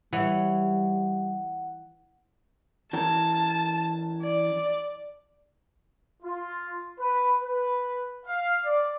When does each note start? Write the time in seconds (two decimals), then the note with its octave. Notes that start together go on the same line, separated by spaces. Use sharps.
0.13 E3 G3 C#5 F#5
2.93 E3 C#4 A#4 A5
4.22 D5
6.23 F4
6.99 B4
7.42 B4
8.26 F5
8.64 D5